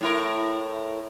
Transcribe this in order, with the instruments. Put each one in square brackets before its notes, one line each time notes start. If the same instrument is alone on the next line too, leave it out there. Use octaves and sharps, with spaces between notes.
[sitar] A2 E4 A#4